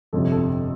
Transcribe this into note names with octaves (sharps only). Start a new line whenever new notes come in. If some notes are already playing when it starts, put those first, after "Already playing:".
G1 F2 C3 A4
A4